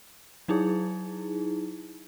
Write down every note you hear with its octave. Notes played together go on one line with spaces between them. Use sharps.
F#3 D#4 E4 G#4